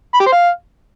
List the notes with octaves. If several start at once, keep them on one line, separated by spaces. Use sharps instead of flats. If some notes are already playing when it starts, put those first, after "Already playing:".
B5
G4
C5
F5